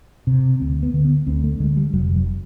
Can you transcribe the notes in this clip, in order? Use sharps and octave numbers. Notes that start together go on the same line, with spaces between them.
C3
D2 C4
B3
D3
B3
D2 C4
A3
D3 G#3
G3
F1 F#3
F#3